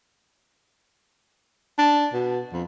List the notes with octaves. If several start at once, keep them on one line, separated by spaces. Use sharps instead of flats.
D4
B2
F2